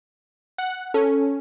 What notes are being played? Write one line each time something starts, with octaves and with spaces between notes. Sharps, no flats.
F#5
C#4 A4